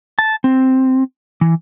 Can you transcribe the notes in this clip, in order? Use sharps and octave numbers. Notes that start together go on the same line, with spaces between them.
A5
C4
E3